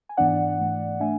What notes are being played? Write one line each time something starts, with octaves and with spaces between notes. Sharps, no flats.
G#5
G#2 E3 B3 D4 D5 F#5
G#2 E3 A3
A3 D4 E5 G#5